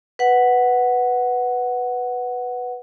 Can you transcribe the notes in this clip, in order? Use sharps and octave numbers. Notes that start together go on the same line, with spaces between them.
B4 F#5